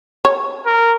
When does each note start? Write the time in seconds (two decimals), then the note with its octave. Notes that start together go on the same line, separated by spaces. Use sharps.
0.25 C#5
0.66 A#4